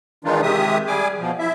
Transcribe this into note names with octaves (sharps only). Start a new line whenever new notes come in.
D#3 E3 G#3 D4 D#4 F4
C3 D#3 G#3 G4 E5 D#6
G3 G#4 G#5 D6
B2 F3
E4 E5